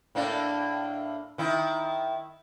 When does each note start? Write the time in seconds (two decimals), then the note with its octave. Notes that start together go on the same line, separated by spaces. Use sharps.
0.15 A2 A#3 D4
1.38 D#3 E4